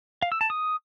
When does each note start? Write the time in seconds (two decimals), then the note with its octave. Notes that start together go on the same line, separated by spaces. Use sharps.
0.22 F5
0.32 E6
0.41 A5
0.50 D#6